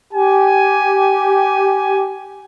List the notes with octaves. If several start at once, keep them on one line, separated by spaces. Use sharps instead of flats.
G4 G#5